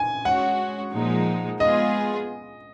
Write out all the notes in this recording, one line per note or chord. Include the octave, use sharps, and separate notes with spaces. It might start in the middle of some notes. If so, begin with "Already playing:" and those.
Already playing: G#5
G#3 C#4 F#4 F#5
A#2 F3 G#3 D#4
G#3 B3 F4 G#4 D#5